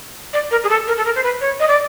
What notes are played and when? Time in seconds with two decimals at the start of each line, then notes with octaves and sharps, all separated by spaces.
0.33 D5
0.51 A#4
0.64 G#4
0.69 A4
0.87 A#4
0.97 A4
1.05 A#4
1.15 C5
1.23 B4
1.41 C#5
1.60 D#5
1.68 D5